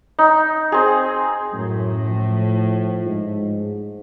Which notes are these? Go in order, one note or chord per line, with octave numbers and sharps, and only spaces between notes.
D#4
C4 G#4
F#2 A2
F3
G#2